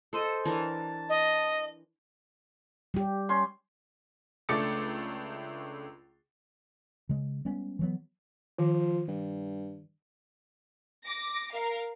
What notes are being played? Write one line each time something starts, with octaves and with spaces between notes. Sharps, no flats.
A4 C5 D#5
E3 D4 A#4 A5
D#5
G3 G4
C#4 C6
C#2 A3 D4 D6 A6 C#7
C#3 G#3
G3 G#3 B3 C#4
E3 F#3 B3
D#3 F3
G2
D6 A#6
A#4 F5